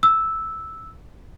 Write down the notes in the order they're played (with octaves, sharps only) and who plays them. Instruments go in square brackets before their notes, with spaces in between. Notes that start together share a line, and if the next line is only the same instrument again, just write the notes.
[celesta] E6